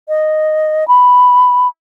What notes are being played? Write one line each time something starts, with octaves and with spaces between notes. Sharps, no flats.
D#5
B5